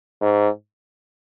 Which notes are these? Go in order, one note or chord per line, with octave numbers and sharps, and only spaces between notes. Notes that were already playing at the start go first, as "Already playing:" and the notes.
G#2